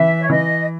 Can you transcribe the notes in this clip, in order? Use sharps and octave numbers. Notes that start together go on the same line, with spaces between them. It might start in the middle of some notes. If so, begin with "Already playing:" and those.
Already playing: E3 E5
C#5
E3 D#5